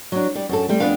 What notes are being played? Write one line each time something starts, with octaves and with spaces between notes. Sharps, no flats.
F#3 D4
G3 D5
F#2 A4
G3 A3 C4
F2 B3 D4 B4 F5